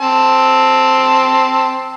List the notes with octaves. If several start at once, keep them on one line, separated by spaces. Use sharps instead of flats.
C4 A5